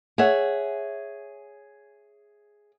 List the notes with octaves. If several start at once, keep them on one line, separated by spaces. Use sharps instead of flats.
G#4 C#5 E5 F#5